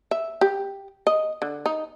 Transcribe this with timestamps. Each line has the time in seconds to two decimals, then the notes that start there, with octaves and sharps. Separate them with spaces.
0.11 E5
0.41 G4
1.07 D#5
1.42 D3
1.66 D#4